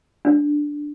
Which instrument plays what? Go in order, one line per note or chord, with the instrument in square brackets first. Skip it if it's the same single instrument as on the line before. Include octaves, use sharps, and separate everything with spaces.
[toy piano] D4